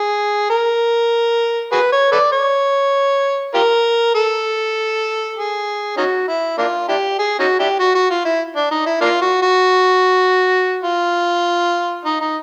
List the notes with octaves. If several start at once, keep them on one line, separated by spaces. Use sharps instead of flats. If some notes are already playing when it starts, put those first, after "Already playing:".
Already playing: G#4
A#4
F#4 G#4 B4
C#5
A4 B4 D5
C#5
F4 G4 A#4
A4
G#4
C#4 D#4 F#4
E4
A#3 D4 F4
D4 E4 G4
G#4
C#4 D#4 F#4
D4 E4 G4
F#4
F#4
F4
E4
D4
D#4
E4
A#3 D4 F4
F#4
F#4
F4
D#4
D#4